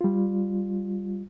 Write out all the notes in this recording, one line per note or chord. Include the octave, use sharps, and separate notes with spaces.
G3 F4